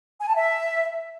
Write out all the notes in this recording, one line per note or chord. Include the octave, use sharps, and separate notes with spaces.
G#5
A5
E5